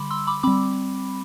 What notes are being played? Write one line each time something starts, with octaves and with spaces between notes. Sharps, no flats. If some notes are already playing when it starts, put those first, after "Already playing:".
Already playing: D3 G3 B5 C6 D6
C6 E6
B5 D6
G3 C4 B5 D6